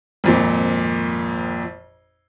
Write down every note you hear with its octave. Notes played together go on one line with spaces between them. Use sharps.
G#1 F2 A#2